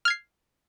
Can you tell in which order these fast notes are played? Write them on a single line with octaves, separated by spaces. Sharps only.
F6 G#6 C7